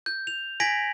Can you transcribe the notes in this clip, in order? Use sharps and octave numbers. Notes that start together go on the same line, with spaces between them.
G6
F7
G#5 G#6 A#6 B6 D7 F#7